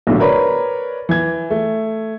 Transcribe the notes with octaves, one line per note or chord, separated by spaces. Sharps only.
B1 A2 D3
A#4 B4 C#5 D5 B5
E3 G#6
A3